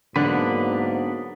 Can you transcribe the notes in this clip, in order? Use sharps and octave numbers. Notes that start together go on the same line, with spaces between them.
G#2 D3 F#3 A#3 B3 D4 B4